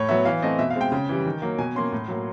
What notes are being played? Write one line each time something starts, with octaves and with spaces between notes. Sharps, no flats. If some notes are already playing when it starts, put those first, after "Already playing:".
Already playing: A2 C#5
F#3 B3 E5
E3 F5
A3 C4 D#5
B2 E5
F5
G#3 C4 G5
C#3
E3 G3
D#3
F#3 A#3
B2 G#5
F#3 A#3 C#4 C6
A2
F#3 A#3